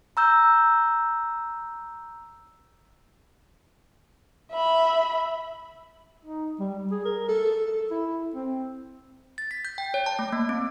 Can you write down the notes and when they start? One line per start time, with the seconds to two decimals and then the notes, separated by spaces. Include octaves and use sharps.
0.17 A#5 E6 G6
4.52 E5 B5
6.24 D#4
6.60 G3
6.91 G#4
7.05 A#4
7.29 A4
7.66 A4
7.91 E4
8.35 C4
9.38 A6
9.51 B6
9.65 G6
9.78 G5
9.94 C#5
10.06 A5
10.19 A3
10.32 A#3
10.49 C4